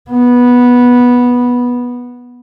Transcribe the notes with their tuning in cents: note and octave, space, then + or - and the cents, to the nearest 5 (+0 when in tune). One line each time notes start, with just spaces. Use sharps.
B3 -10